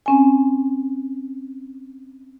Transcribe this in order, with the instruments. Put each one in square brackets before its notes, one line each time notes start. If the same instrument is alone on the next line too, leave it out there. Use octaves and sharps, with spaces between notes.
[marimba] C4 C#4 G#5